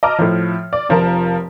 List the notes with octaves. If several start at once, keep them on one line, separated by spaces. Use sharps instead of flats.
D#5 A5 A#5 D6 F6
A2 F3
D5
F1 F3 F4 A#4 A5